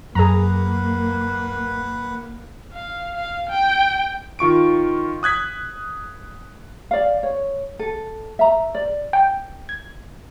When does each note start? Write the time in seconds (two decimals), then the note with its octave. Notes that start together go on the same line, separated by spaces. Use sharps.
0.15 F#2 A#3 G#4 B4 F#5 A#5
2.73 F5
3.15 F5
3.49 G5
4.39 D#3 F4 C#6 D7
5.23 D#6 F#6 G#6 B6
6.91 D5 F5
7.23 C#5
7.79 A4
8.39 E5 A#5
8.75 D5
9.13 G5
9.69 G#6